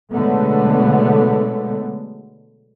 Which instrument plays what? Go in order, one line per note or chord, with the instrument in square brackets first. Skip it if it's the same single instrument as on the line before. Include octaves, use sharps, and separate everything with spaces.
[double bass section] B2 D3 F#3 G#3 A3 B3